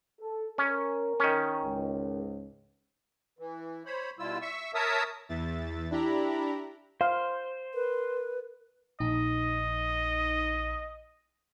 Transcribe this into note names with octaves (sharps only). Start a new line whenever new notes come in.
A4
C#4 A#4
D#3 C#4
C#2 G#2
E3
C5 C#5 B5
B2 G3 E4 F4 E6
E5 C#6 E6
A#4 C#5 E5 A5 D#6 E6
E2 E5 A6
D4 E4 G4 A#5 B5
C5 F5
A#4 B4
A#1 D#4 D#5